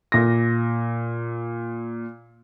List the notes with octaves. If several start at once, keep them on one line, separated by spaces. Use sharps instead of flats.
A#2 A#6